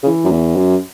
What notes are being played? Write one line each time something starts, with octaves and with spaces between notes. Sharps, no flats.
C#3
E3
F#2
E2
F#2